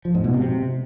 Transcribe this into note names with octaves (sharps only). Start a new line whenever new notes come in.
F3
G#2
B2
C3